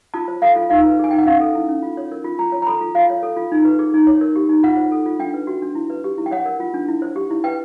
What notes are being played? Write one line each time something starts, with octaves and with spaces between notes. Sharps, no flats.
F4 A5
C5
A4 F5
F4
D#4 F5
B4
G#4 G#5
D#4 G5
F#5
C#4 F5
A4
E4
C#4
F4
C#5
A#4
F4
F4 A#5
C#5
A#5
A4 B5
F4
F4 F5
C#5
A4
F4
D#4
B4
G#4
D#4
C#5
A#4
G4
D#4
F4 F#5
C5
A4
F4
D4 G5
B4
F#4
D4
E4
B4
G4
E4
G5
C#5 F#5
A#4
F4
D4
E4
C5
G4
E4
B4 G5